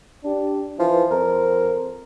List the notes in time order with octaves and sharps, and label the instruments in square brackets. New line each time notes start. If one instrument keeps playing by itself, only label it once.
[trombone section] D4 G4
[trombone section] E3 [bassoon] F3
[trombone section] F2 C5 [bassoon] A#4